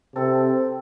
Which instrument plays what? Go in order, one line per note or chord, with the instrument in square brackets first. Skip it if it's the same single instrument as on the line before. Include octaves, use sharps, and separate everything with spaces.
[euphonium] C3 [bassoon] C4 [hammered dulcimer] A4